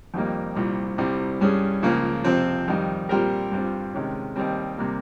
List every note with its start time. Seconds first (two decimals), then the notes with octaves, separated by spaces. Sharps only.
0.14 F2 D#3 G3 A#3
0.55 C2 A#2 G3
0.98 C2 C3 G3
1.41 G2 G3 C#4 G#4
1.82 C#2 C#3 F3 A#3
2.24 F2 C3 F3 C4
2.67 F2 D#3 G3
3.09 A#2 G3 C4 G4 A#4
3.51 G2 G3 C4 F4
3.93 C3 D#3 G#3 C#4
4.36 D#2 D#3 G3 C4
4.78 C3 G3 A#3